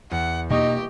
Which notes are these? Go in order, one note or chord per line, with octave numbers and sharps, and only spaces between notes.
E2 F#5
B2 A#3 D#4 G4 D#5 C#6 D#6